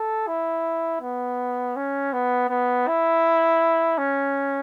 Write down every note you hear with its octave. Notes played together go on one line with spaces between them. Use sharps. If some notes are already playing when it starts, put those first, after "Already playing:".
Already playing: A4
E4
B3
C#4
B3
B3
E4
C#4